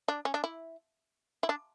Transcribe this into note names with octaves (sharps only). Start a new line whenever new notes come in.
D4
C#4
D4
E4
E4
D4